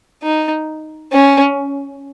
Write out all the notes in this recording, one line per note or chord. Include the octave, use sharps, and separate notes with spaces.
D#4
C#4